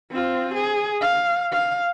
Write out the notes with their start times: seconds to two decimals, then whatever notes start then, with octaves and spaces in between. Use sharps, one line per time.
0.11 C4 F4
0.55 G#4
1.01 F5
1.52 F5